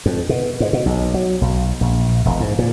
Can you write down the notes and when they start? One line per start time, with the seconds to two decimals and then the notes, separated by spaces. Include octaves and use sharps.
0.06 F2
0.29 B2
0.60 G#2
0.73 B2
0.86 B1
1.14 F#3
1.41 B1
1.81 A#1
2.25 E1
2.40 G#2
2.59 A#2